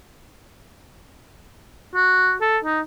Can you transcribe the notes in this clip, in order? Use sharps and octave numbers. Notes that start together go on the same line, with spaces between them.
F#4
A4
D#4